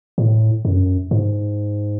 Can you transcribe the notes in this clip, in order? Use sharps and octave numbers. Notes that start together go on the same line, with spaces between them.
A2
F#2
G#2